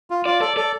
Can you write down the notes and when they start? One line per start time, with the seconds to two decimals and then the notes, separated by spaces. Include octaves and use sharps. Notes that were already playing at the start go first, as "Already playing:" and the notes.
0.10 F4
0.26 F4 D5
0.41 A4 D5
0.57 A4 D5